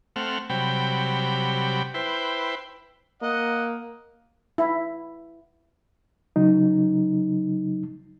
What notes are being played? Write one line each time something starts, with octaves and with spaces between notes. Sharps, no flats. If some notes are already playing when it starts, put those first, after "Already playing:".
A3 C4 F#5 F6
C3 F#3 G3 G5 B5
E4 B4 C5 G5
A#3 D#5 F#5
E4
C#3 F#3 D#4